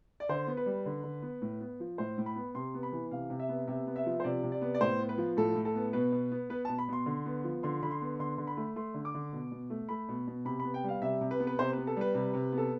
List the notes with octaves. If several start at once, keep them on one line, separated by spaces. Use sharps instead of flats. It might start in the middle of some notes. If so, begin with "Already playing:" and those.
D5
D3 C5
B3
B4
G3
D3
D3
B3
A2
B3
F3
A2 C5
A2
B5
B3
C3 C6
B3
B5
E3
C3 F5
C3
E5
B3
C3 E5
B3
E5
F3
C5
C3 D5
C3
D5
B3
D5
A2 C5
B3
B4
F3
A2 A4
A2
A4
B3
B2 B4
B2
B3
B3 B4
B2 A5
B5
B2 C6
D3
B3
F3
D3 C6
D3 B5
C6
B3
D3 C6
D3
B5
A3
A3 C6
D3
D6
D3
B2
B2
A3
A3 B5
B2
B2
C3 B5
B3 B5
G5
G3 F5
C3 E5
C3
B4
B3
B4
C3 C5
B3 B4
A4
G3 B4
C3
C3
B3
A4